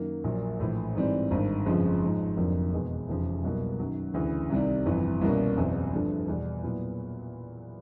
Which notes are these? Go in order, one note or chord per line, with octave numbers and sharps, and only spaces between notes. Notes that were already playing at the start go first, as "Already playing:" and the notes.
Already playing: F#2 D#3 F#3 A#3
A#1 A#2 F#3 A#3
A#1 A2 E3
G#2 E3 G3 C4
G#1 G2 D#3
G1 F2 C#3 F3 G#3
G#2 F3 G#3
F1 F2 D3 F#3 A#3
E2 B2 G#3
F1 E2 C#3 F3
C2 B2 F#3 A#3
F#2 D#3 F#3
D2 C#3 E3
C2 C3 D#3 G3
G1 F2 C3 E3
C2 B2 G3 A#3 C#4
F#1 E2 B2 G3 C4
G2 D3 F3 A3
E2 B2 G3
A#2 F#3 B3 E4